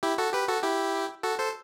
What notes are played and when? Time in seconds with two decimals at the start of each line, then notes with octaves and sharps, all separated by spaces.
0.03 E4 G4
0.18 F#4 A4
0.34 G4 B4
0.48 F#4 A4
0.63 E4 G4
1.23 F#4 A4
1.39 A4 C5